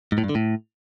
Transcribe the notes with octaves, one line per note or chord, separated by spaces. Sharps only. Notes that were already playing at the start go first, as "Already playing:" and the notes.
G#2
A2
G2
D3
A2